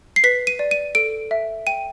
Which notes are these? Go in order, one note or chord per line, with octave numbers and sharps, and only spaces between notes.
C7
B4 B6
D#7
D5
D#7
A4 D7
E5
G5 D#7